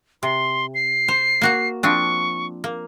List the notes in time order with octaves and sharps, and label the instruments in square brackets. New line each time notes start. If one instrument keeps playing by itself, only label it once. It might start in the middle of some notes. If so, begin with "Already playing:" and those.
[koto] C3 [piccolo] C6
[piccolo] C7
[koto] C5
A#3 F#4 F#5
[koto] F3 C4 D4 [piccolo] C#6
[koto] A#3